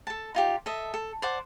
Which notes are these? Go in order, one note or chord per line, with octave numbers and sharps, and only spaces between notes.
A4 A5
D#4 F4 G4
A4 D#5 E5
A4
C5 D5 F#5